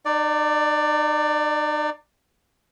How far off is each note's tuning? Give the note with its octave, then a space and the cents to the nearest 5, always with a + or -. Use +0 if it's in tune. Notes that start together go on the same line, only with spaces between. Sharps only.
D#4 -40 D5 +10